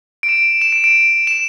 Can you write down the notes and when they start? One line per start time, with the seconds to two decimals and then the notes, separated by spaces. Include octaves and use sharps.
0.23 D7
0.29 E7
0.61 E7
0.72 D7
0.84 D7
1.27 E7